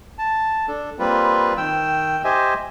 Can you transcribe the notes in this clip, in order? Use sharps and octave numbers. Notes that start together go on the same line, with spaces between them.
A5
D4 A4
G3 A#3 C4 F4 B4
D#3 G5 E6
G4 C5 D#5 E5 G#5